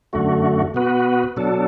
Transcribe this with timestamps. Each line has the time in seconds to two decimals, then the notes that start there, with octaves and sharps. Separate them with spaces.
0.13 F#2 D3 A3 F#4
0.74 B2 B3 F#4 B4
1.37 B2 F#3 D4 A4